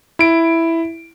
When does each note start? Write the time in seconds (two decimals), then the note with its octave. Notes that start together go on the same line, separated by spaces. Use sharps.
0.19 E4 D7